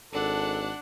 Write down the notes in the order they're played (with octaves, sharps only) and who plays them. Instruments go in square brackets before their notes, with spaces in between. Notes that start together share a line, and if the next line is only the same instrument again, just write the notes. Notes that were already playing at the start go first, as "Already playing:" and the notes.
[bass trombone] G#1 [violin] D4 F#5 [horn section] A4